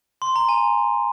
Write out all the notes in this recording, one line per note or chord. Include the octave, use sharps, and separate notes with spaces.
C6
A#5
G#5